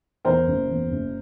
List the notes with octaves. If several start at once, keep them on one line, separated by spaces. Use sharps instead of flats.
E2 A#4 C5
F#1
E2
F#1